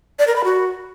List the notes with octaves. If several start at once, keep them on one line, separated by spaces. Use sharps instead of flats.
D5
A#4
B5
F#4